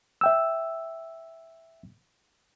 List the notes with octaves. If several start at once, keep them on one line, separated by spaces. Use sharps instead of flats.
E5 G5 E6